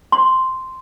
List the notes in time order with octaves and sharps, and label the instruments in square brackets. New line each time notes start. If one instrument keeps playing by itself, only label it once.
[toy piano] C6